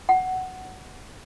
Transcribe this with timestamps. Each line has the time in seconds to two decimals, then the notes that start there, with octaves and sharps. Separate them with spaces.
0.09 F#5